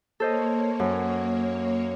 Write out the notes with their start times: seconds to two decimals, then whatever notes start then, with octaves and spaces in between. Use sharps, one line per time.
0.20 A#3 A4 C5 C#5 D#5
0.79 F#2